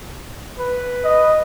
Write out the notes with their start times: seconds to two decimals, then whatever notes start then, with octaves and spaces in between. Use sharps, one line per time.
0.59 B4
1.04 D#5